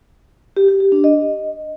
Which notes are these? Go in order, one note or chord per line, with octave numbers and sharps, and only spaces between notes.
G4
G4
G4
D4
D#5